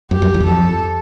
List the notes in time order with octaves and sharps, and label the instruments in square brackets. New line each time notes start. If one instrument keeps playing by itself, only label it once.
[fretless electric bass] F#2 [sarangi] G4
[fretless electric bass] F#2
E2
F#2
[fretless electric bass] F2 [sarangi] A4